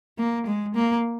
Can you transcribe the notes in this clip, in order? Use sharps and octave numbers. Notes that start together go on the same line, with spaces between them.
A#3
G#3
A#3